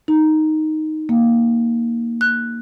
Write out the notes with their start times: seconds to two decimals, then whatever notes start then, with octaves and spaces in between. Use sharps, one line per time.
0.08 D#4
1.09 A#3
2.21 F#6